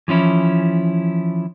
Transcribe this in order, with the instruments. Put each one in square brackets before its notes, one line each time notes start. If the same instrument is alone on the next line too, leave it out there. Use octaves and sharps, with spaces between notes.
[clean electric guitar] E3 F3 C#4 E4